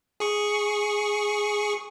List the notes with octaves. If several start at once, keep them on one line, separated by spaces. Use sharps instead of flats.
G#4 C#6